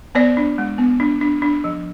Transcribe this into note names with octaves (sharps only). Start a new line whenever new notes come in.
B3 C5 D5
D4
G#3
B3
D4
D4
D4
F3